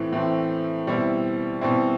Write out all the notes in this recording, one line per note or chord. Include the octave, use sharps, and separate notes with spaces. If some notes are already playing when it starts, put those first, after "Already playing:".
Already playing: A2 E3 A3 C4
A2 E3 A3 C4
B2 G3 C4 E4
B2 G3 C4 E4